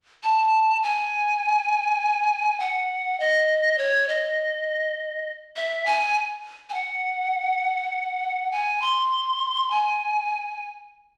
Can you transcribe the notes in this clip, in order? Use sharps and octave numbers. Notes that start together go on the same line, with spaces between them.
A5
G#5
F#5
D#5
C#5
D#5
E5
G#5
G#5
F#5
G#5
C6
G#5